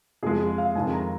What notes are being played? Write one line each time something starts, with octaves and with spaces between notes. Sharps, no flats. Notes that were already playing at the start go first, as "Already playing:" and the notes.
F2 F3 G#3 G#4
G#4
F5
F2 D#3 G#3 G#5
A#5